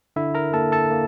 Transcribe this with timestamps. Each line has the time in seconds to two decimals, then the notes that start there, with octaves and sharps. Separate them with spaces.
0.16 D3 E4 E5
0.35 A#4 A#5
0.53 A#3 A4 A5
0.72 A4 A5
0.91 A#3